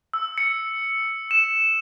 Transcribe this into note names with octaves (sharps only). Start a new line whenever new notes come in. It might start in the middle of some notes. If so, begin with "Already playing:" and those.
E6
C#7
E7